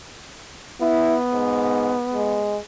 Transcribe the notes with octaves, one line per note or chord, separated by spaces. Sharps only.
B3 E4
G#2
G#3